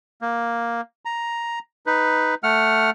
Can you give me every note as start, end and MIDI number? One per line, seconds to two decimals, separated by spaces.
0.21 0.81 58
1.05 1.59 82
1.86 2.35 63
1.86 2.35 71
2.43 2.90 57
2.43 2.90 78
2.43 2.90 89